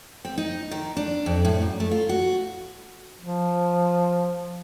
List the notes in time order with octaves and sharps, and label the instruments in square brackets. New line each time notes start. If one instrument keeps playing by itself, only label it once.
[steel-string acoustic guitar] C4
D#4
D#3
D4
F2
A2
F#2
A3
F4
F#4
[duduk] F3